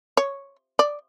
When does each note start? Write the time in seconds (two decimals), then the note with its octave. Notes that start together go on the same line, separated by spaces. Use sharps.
0.17 C#5
0.79 D5